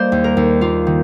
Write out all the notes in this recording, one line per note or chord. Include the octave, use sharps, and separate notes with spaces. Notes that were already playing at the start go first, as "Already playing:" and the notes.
Already playing: G3 A#3 C5 D#5
D#2
A#4
D#2
A#3 F4
D#3